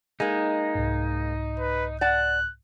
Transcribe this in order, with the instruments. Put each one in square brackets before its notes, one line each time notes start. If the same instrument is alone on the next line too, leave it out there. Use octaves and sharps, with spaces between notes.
[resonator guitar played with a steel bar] G#3 A#3 [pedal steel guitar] D#4
[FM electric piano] C2 G#2
[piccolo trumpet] B4
[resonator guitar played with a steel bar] D5 F#5 A5 [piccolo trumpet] F#6